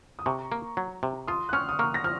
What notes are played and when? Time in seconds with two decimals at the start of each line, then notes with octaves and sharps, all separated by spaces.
0.19 D#6
0.26 C3 A#5 C#6
0.52 A#3
0.77 F#3
1.03 C3
1.28 F4 C6 D#6
1.49 F#6
1.53 C#4 C#6 F6
1.69 D#6
1.79 A#3 C#6 F6
1.94 A#6
2.04 F3 F6